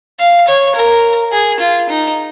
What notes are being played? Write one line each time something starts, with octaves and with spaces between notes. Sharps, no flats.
F5
C#5
A#4
G#4
F4
D#4